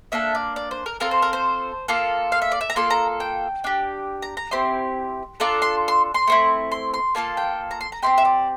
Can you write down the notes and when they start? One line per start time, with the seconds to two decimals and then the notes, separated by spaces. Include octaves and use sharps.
0.12 A#3 D4 A4 E5
0.35 D5
0.56 D5
0.71 C5
0.86 A#4
1.00 C4 F4 A4 A#4
1.11 C5
1.22 A#4
1.33 C5
1.88 A#3 F4 A4
2.32 F5
2.42 E5
2.52 D5
2.61 E5
2.70 A#5
2.76 A#3 F4 A4 C6
2.90 A#5
3.20 G5
3.64 D4 G4
4.22 A#5
4.37 A#5
4.51 C4 E4 G4 C6
5.40 D4 F4 A4 A#5
5.62 C6
5.88 C6
6.14 C6
6.27 A3 C4 E4
6.72 C6
6.94 C6
7.15 A#3 F4 A4 A5
7.37 G5
7.71 A#5
7.81 C6
7.92 A#5
8.03 C4 E4 G4 C6
8.18 E5
8.25 D5